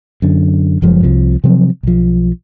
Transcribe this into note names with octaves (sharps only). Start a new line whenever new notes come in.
F#2 D3
F#1 F#2 F3 G#3
C2 C3 F3
C3 F3 F#3 C4
B1 F3